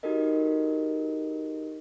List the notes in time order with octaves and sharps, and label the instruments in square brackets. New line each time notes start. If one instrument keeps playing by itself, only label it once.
[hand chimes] D#4 F#4 G4 A4 A#4 D#5